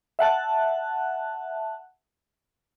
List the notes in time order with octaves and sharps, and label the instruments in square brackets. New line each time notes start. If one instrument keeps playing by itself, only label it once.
[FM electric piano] E5 F#5 A5 F#6